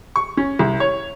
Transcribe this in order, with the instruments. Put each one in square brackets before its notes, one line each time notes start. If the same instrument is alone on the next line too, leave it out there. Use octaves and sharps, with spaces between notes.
[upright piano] C#6
C#4
C2
C#5